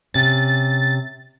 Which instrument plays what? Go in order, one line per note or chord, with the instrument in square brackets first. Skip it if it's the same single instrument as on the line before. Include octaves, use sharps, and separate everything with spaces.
[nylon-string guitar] C3 C#4 [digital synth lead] A6